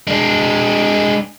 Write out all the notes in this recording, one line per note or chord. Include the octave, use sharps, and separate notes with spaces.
G#3 D4